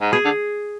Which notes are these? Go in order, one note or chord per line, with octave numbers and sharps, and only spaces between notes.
G#2
B2 G#4
D3